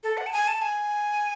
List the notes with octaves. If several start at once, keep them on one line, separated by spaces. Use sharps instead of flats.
A4
F#5
A5
G#5
A5
G#5